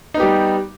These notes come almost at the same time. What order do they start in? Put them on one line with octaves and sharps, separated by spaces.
D#4 B3 G4 G3